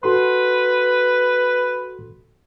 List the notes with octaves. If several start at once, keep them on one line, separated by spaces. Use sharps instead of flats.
F#4 A4 B4 C6